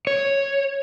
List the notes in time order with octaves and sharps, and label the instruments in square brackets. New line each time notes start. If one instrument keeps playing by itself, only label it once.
[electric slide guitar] C#5